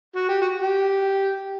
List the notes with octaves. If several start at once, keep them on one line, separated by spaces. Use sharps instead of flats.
F#4
G4
F#4
G4